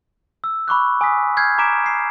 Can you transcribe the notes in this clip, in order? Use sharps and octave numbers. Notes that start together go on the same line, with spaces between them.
E6
B5 C#6 D6 F#6
G#5 D#6 E6 B6
F6 G6 G#6 C7
A#5 D6 B6 D7 E7
C7